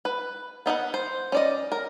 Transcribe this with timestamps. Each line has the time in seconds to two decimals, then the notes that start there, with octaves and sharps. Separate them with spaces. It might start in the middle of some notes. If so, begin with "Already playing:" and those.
0.05 B4
0.66 B3 D#4 E5 F#5
0.94 C5
1.32 C#4 D5 D#5
1.72 A#4